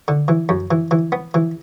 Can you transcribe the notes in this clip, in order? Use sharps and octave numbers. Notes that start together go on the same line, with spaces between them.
D3
E3
F#2
E3
E3
B3
E3